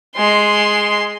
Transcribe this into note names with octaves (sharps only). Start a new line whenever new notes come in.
G#3 C6